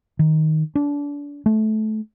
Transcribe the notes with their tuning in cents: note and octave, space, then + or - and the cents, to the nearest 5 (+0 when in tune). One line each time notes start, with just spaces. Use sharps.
D#3 +5
D4 -30
A3 -20